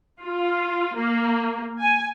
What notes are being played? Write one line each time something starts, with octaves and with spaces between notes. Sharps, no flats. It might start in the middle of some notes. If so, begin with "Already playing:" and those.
F4
A#3
G#5